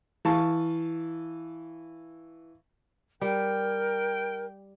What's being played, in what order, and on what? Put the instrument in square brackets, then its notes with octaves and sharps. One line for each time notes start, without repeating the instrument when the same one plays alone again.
[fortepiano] E3 F5 A5 C#6
[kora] G3 [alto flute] A#4 [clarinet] G5